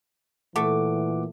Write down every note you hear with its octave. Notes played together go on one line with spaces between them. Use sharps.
A#2 E3 A3 F#5 D6